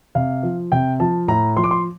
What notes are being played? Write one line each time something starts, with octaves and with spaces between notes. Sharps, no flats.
C3 F5
F3
C3 G5
F3 A5
A2 A#5
F3 C6
D6
C6